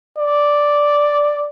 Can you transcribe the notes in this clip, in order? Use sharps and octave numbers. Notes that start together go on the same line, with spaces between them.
D5